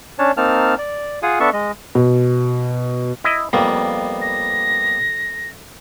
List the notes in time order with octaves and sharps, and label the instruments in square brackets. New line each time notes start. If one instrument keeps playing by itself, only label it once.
[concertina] C#4 D4 C#5 A5
A#3 C4 D#4 A5 F6
D5
F4 G#4 F5 F#5 G#5 D#6
B3 D4 A4 E5 A5 C#6
G#3 D#5
[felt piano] B2
[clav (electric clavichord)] E4 D#5
[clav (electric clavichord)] F2 [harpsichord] G3 A#3 B3
[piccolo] A#6